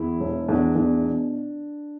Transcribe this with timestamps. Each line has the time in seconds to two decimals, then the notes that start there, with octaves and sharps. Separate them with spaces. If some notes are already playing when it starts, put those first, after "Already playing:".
Already playing: E2 E4
0.20 E1
0.48 E2 D4
0.76 E2
1.02 B2